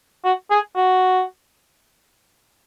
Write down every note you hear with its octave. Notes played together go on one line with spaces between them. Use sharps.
F#4
G#4
F#4